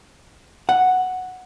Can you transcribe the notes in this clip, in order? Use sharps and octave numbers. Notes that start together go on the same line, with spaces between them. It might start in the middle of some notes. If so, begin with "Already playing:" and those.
F#5